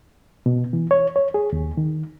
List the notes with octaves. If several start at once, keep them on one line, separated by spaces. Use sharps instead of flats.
B2
E3
C#5
C#5
G#4
D#2
D#3